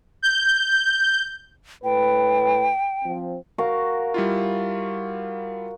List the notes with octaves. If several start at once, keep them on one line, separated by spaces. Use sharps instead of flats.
G6
A2 B4 G5
F3 C4
F#4 A#4 F5
G3 E4 F4